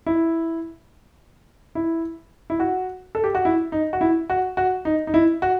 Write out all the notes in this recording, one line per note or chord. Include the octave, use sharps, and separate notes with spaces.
E4
E4
E4
F#4
A4
G4
F#4
E4
D#4
F#4
E4
F#4
F#4
D#4
D#4
E4
F#4